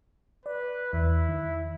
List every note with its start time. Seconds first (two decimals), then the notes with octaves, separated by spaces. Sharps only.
0.46 B4 D5
0.93 E2 E4
1.29 D#3